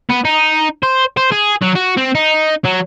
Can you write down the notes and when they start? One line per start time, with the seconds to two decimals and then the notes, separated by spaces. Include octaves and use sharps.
0.09 B3
0.25 D#4
0.83 C5
1.17 C5
1.32 G#4
1.62 F#3
1.75 F#4
1.97 C4
2.15 D#4
2.65 F#3